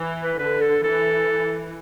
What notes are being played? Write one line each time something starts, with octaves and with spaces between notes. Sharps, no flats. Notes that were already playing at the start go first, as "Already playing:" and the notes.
Already playing: E3
B4
D3 B4
A4
E3 A4